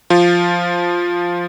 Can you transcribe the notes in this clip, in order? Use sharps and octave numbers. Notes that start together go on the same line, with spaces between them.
F3 F4